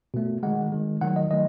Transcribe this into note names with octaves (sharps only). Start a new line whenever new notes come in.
B2 A3
D#3 G#3 F#5
D#3 G#3
D#3 F#3 A3 F#5
D#5
D#3 F#3 A3 D#5